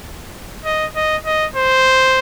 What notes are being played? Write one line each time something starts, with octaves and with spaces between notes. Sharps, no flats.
D#5
D#5
D#5
C5